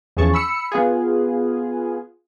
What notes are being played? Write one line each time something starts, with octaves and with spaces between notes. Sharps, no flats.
E2 F3 C#4 G#4 A5 C#6
B5 E6 C#7
B3 F4 G#4